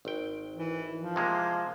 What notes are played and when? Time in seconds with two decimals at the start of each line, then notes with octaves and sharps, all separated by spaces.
0.05 G#1 G5
0.56 E3
1.00 F3
1.16 C3 G#3 A#3